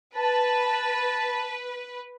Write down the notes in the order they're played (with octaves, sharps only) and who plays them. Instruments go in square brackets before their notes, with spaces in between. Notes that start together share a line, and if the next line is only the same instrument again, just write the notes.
[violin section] B4 [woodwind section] A5